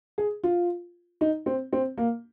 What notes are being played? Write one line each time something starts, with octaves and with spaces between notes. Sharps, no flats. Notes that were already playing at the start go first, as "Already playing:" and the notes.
G#4
F4
D#4
C4
C4
A#3